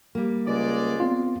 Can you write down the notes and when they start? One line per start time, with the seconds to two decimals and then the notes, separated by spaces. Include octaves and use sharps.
0.15 G3 A#3
0.47 C#2 G#3 D5
1.00 B3 C4 F4